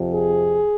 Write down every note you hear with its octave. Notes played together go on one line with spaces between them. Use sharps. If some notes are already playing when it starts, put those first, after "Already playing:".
Already playing: F2 C3 F3
G#4